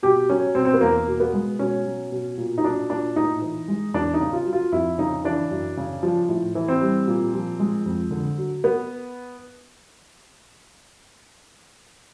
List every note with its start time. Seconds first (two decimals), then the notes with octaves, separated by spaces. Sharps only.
0.03 B2 G4
0.29 F#3 C#4
0.55 B2 C4
0.65 C4
0.74 B3
0.81 E2 A#3
1.07 B2
1.20 B3
1.34 G#3
1.59 B2 C#4
1.86 F#3
2.12 B2
2.38 A#2
2.58 D#4
2.64 F#3 D4
2.89 A#2 D4
3.16 A2 D#4
3.42 E3
3.68 G#3
3.94 E2 D4
4.14 D#4
4.20 C#3
4.33 F4
4.46 F#3
4.53 F4
4.72 F2 E4
4.98 C#3 D#4
5.24 E3 D4
5.50 F#2
5.77 C#3
6.03 F3
6.29 A2
6.55 E3
6.68 C4
6.81 G3
7.08 A#2
7.34 F3
7.60 G#3
7.86 F2
8.11 D3
8.38 F#3
8.64 B3